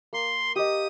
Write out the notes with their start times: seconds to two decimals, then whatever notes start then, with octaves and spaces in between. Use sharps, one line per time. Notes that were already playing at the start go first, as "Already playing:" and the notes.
0.13 A#3 C6
0.55 G4 D#5 D#6